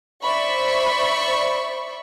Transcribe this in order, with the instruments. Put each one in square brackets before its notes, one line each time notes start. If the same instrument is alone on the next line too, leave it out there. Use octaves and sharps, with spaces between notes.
[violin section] C5 D5 E5 B5 C#6